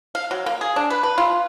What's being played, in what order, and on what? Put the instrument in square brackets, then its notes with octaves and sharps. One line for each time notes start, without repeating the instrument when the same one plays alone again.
[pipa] F5
F#3
A#3
G#4
D4
B4
B4
F4